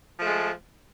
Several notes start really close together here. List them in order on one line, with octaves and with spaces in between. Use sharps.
F3 A3 G#3